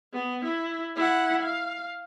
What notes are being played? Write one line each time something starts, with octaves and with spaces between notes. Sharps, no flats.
B3
E4
E4 F#5
F5